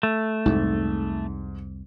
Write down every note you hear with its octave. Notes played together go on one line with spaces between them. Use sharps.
A3
C2 F2 G#2